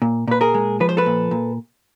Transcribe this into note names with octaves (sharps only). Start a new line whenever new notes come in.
A#2
A#2 B4
G#4 A#4
G#3
F3 B4
C5
A4 B4
A#2
A#2